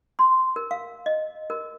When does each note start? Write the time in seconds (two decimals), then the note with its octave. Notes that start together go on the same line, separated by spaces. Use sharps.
0.19 C6
0.56 A#4
0.71 F5
1.06 D#5
1.50 A#4